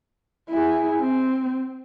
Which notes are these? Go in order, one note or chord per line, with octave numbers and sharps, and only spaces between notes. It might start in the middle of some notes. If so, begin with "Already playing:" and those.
E4 G#4
C4